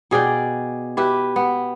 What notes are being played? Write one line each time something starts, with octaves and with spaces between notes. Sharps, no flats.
B2 G#4 D5 G5
E4 G4 B4
B3